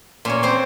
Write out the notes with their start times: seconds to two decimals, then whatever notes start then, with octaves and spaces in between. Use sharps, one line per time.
0.25 A#2 C#4 C#5
0.43 C4 C5